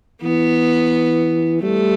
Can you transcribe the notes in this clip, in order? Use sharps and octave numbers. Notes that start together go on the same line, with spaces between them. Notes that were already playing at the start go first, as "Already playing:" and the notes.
E3 B3
G3 A3